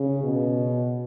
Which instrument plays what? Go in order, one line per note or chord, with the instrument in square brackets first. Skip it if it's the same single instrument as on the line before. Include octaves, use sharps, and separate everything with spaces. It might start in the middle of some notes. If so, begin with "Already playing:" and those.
Already playing: [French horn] C#3
B2